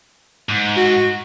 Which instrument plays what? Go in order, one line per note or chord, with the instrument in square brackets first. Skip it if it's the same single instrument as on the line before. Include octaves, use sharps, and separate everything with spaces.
[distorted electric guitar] G#2
[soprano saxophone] F#4